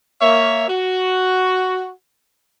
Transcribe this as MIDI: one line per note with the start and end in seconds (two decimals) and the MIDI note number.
0.21 0.65 58
0.21 0.65 73
0.21 0.65 76
0.68 1.90 66